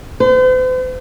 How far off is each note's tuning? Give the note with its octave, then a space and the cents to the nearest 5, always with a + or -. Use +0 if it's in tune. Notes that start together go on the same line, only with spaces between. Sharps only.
C5 -45